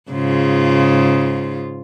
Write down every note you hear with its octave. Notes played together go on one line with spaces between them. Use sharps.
G#2 C#3 F4